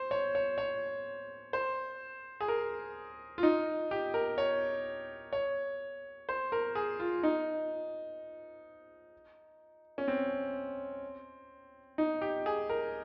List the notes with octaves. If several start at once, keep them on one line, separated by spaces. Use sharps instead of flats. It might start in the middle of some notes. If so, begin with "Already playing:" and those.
Already playing: C5
C#5
C#5
C#5
C5
G#4
A#4
F4
D#4
G4
A#4
C#5
C#5
C5
A#4
G#4
F4
D#4
C#4
C4
D#4
G4
G#4
A#4